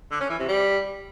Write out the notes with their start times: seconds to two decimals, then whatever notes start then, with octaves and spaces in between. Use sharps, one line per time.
0.11 D3
0.21 C#4
0.30 E3
0.39 C3
0.48 G3